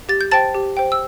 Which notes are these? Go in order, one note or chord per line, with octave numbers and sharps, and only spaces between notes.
G4 A6
G6
C5 G5 A5 A6
G4
C5 G5
E6